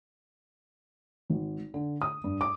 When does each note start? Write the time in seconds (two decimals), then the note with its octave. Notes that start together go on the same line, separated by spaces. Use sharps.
1.30 G#1
1.74 D3
2.02 D#6
2.24 G2
2.41 D6